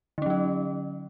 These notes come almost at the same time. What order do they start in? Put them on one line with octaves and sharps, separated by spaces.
D3 C#4 F#3 D#4